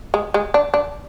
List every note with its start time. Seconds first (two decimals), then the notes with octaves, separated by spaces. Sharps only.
0.14 G#3
0.34 G#3
0.54 D4
0.74 D4